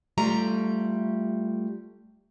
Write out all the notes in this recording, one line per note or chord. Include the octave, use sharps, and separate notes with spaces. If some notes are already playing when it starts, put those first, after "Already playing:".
G3 A3 F4 G4 A#5